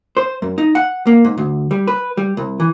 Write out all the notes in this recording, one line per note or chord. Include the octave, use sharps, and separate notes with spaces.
C5
F#2
D#4
F#5
A#3
G#2
D2
G3
B4
G3
C2
E3